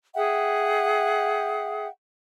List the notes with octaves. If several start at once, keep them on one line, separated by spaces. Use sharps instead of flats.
G#4 E5 F#5 G5